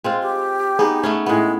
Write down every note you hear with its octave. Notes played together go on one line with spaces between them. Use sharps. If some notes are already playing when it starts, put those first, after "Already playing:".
G#3 C4 F4
G4
B3 D#4 G#4
A3 B3 C#4
A2 G#3 B3